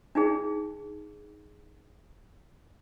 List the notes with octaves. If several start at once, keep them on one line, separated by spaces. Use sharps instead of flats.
D4 D#4 G#4